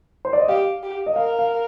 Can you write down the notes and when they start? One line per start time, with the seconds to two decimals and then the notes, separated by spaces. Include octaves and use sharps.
0.25 C5
0.33 D5
0.40 D#5
0.48 G4 F5
0.83 G4
1.06 D#5
1.16 A#4 F5
1.39 F5